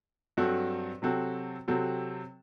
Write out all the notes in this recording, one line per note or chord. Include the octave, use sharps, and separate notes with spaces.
G2 F#3 C4 F#4 A4
C3 F#3 C4 F#4 A4
C3 F#3 C4 F#4 A4